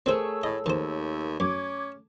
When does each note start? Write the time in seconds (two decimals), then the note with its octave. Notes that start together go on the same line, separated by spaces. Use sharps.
0.06 A3 C4 G#4 A#4 C5 C#5 C#6 E6
0.43 A2 D#5
0.66 D#2 D#3 C5
1.40 F#2 C#4 D6 G#6